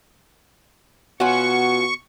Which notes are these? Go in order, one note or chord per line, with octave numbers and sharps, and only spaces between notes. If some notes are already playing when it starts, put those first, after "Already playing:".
B2 C#4 F4 F#4 C#6